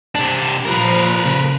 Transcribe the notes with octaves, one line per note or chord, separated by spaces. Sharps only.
C3 D4
A#2 F3 A#4 B4
C#3